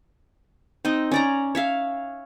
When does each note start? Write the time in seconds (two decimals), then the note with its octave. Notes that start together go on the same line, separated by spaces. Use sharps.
0.85 C4 D#4 D#5
1.12 C#4 D5 A#5
1.55 C#5 E5 F5